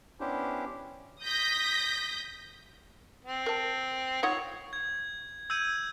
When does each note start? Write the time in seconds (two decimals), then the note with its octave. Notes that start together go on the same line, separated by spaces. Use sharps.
0.20 B3 C#4 D4 E4 G4 C5
1.23 D#6 G6 A#6 B6
3.25 C4
3.46 A#4 A5
4.23 D#4 F4 C#5 F#5
4.73 G#6
5.50 E6 G6 G#6 D#7